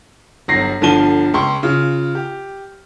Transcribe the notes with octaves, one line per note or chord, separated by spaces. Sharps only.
G1 F#3 A#6 C7
G1 D3 F3 A5 D#7 G7
C#2 C6 C#6
C#3 F4
G4